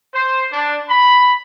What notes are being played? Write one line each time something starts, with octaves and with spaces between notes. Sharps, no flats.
C5
D4
B5